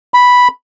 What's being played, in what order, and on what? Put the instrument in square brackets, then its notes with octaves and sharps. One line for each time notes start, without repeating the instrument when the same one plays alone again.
[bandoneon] B5